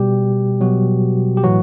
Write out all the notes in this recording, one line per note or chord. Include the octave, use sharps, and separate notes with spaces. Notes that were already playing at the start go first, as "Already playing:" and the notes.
Already playing: B2 G3 G4
B2 F#3 F#4
G4
A2 E3 F#3 F#4